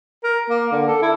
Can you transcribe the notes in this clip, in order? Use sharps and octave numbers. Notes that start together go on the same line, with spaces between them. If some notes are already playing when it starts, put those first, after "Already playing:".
A#4
A#3
D3
A4
E4